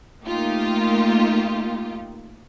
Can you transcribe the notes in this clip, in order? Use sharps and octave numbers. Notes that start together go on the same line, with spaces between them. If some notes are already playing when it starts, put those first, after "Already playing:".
A3 A#3 D#4 F4 G4